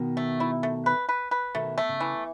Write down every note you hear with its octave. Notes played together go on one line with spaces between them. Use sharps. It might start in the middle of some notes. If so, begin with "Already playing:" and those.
Already playing: B2 D#3
A3
E4
A3
B4
B4
B4
B2 D#3 A3
A3
C#3
E3